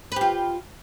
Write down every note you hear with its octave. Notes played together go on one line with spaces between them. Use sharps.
F4 G4 B4